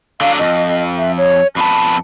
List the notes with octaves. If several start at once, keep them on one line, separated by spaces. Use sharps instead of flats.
D3 F#3 D4 F5
F2 D#5
E5
C#5
F2 B3 A5 B5